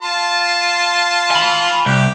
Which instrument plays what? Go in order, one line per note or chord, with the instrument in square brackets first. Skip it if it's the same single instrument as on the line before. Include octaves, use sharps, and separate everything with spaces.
[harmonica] F4 A5 C6
[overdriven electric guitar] G#5 B5
[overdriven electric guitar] C2 [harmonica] G4